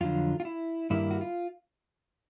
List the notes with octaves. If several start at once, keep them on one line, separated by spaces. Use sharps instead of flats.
F2 D3 F#3 F4
F4
E4
G2 D#3 G3 A#3 E4
F#4
F4